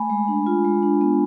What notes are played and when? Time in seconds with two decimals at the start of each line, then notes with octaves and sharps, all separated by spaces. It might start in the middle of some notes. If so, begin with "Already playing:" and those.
Already playing: A3 G#5 B5
0.10 G#3
0.28 D4
0.46 F4
0.65 G#3
0.82 D4
1.01 B3